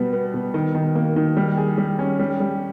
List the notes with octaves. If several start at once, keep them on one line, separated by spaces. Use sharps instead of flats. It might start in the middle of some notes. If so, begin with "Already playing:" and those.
Already playing: B2 G3 B3
B3
B2
D#3
D#3
A#3
D#3
G3
G#4
G3
C#4
G3
G3